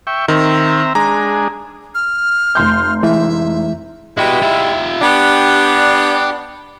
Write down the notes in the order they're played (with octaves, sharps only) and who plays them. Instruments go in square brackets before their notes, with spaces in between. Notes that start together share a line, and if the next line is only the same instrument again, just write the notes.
[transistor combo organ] E5 G5 C#6
[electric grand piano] D#3 [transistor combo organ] C4 E5 A#5
[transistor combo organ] G#3 D4 G#4 [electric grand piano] A#5
[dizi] F6
[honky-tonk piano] F1 C6 G6
[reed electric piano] E3 G#3 E4 [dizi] E5
[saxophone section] G3 G#3 E4 [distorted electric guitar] F#4 B4
[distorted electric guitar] F4 E5
[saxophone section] B3 D4 [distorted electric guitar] G4